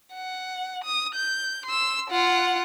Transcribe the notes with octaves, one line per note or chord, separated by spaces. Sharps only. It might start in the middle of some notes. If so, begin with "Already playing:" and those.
F#5
D#6
G6
C6 E6
F4 F#5